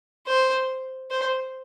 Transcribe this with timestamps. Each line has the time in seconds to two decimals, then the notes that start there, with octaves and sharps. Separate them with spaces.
0.27 C5
1.11 C5